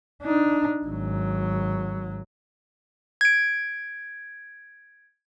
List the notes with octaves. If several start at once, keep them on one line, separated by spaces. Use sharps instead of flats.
D4 D#4
G#1 F#3
G#6 D7